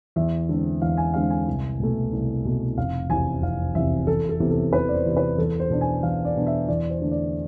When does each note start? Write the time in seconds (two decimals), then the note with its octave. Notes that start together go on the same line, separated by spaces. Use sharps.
0.16 E2 E5
0.49 D3 G#3 C4
0.82 E2 F5
0.97 G#5
1.14 D3 G#3 C4 F5
1.30 G#5
1.47 C2
1.80 B2 A3
2.13 C2
2.45 B2 A3
2.78 F1 F5
3.10 E2 C3 E3 G#5
3.42 F1 F5
3.75 E2 C3 E3 E5
4.07 E2 A4
4.29 A4
4.40 C3 E3 B3
4.51 A4
4.73 E2 B4
4.89 D5
4.94 C5
5.05 C3 E3 B3
5.17 B4
5.38 E2 A4
5.60 C5
5.70 B2 B3 D4
5.81 G#5
6.03 E2 F5
6.25 D5
6.35 B2 B3 D4
6.47 E5
6.68 E2 D5
6.90 C5
7.02 D3 A3
7.12 D5